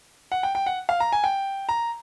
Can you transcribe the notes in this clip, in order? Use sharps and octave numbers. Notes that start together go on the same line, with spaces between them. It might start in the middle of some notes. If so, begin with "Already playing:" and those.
F#5
G5
G5
F#5
F5
A#5
G#5
G5
A#5